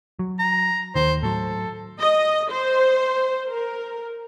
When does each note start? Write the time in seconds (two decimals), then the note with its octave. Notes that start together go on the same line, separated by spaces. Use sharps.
0.19 F#3
0.39 A#5
0.96 D#2 D#3 C5
1.23 A2 F#3 A4
2.00 D#5
2.52 C5
3.48 A#4